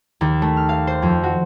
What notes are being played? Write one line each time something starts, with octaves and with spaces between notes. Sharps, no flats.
D#2
A3
F6
F5
C5
F2
F#4